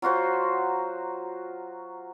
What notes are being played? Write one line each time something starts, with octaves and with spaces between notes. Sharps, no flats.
F#3 F4 F#4 C5